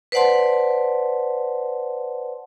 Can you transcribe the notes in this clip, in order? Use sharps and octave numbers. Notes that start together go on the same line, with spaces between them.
B4 C5 D5 F#5 A5 C6